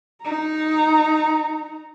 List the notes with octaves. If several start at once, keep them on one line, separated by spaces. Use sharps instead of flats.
D#4 A#5